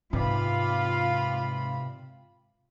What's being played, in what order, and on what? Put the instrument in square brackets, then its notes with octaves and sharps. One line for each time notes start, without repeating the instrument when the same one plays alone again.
[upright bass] G#2 [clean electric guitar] C3 B4 D5 [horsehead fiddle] C4 B5 [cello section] F4